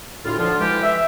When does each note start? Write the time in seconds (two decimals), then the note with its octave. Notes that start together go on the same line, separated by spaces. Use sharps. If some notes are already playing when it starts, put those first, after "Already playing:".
0.24 D2 A2 F4
0.38 D3 F3 F4
0.59 E3 G#3 G4
0.83 E5